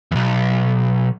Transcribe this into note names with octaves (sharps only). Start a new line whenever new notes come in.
B1 E2